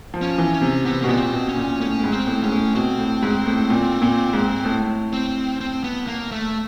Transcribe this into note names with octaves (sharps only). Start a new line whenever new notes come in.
F3
C#4
E3
C#4
C3
C3 B3
B2 A#3
A#2 B3
C4
B2
C#4
A#2
A2 C#4
A2
G#2
C4
A2
G#2 C#4
A2
B2 C4
A2
G#2
A2
A#2
A#2
G#2
A2
C4
C4
B3
A#3
A3